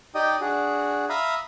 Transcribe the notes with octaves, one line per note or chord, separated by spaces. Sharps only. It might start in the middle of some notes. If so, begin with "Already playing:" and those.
D#4 G4 D5 D#5 G5 D#6
D4 F#4 G#4
E5 F5 A#5 B5 D#6